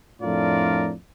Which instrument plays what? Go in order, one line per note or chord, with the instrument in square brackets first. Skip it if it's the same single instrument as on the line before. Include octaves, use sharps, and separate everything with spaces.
[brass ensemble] F2 A2 D4 F4 A#4 D5